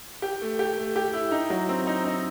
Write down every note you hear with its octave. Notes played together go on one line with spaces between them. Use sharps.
G4
A3
G4
A3
G4
E4
D#4
F#3
C4
D#4
D#4